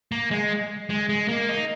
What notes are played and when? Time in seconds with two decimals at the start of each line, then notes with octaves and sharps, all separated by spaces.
0.12 A#3
0.31 G#3
0.90 G#3
1.09 G#3
1.28 A#3
1.49 D#4